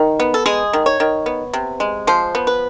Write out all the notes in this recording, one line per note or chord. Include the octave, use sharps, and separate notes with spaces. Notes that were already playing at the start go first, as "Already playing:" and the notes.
Already playing: D#3
B3
A4
G#3 G#4
D#3
C#5
D#3
B3
C3
G#3
F3 C5
B3
B4